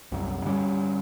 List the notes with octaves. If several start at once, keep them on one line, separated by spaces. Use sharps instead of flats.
C2 F#2
G2 D3 G3 C#4